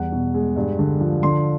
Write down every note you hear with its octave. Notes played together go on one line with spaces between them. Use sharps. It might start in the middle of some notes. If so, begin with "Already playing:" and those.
Already playing: E2 G3 F#5
B2
G#3
G2
D3
F3
D3 C6